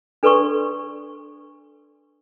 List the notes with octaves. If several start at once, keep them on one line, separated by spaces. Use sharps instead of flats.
D4 A4 B4 D5 C6 C#6